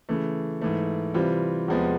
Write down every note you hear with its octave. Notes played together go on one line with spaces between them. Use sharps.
C#3 E3 A3
G#2 E3 A3
C3 E3 G3 C4 F4
E2 C3 F3 G#3 B3